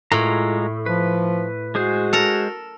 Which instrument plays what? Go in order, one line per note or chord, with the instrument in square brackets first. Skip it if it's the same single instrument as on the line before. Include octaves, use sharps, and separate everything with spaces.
[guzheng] A2 [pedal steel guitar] G#3 F4 A#5
[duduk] F3 [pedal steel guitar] B4
[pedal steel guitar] G#3 G#4 C5 [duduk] F#4
[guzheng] A4 A#4 A#5